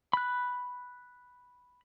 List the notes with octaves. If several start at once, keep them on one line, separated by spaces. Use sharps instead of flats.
B5 F#6